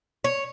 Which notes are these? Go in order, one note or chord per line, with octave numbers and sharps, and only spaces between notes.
C#5